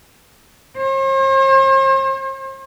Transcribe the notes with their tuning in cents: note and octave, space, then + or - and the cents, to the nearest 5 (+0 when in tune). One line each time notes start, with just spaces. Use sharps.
C5 +45